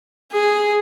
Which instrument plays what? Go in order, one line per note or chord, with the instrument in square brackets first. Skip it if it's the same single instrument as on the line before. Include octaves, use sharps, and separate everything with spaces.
[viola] G#4